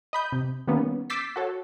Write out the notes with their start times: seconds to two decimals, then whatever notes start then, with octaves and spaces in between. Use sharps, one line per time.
0.13 D#5 B5 G6
0.32 C3
0.67 D#3 G3 A#3 B3 C#4
1.10 D6 E6 G6 A6 B6 C7
1.36 F#4 A4 C#5